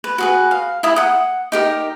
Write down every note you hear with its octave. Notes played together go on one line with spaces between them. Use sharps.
B4
F#4 G#4 B4
F5
E4 G4 A#5 D#6
F#5 D#6
D#4 G4 A#4